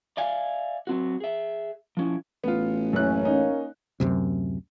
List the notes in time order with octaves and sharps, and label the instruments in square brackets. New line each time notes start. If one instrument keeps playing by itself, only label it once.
[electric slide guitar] D5 E5 F5 G#5
F#3 C4 F#4
G#4 E5
F3 C#4 E4
[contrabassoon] A1 [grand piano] B3 F4
[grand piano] F#2 E3 F#6 [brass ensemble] A#3 C#4
[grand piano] D#4
[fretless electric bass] D1 G1 F#2 C3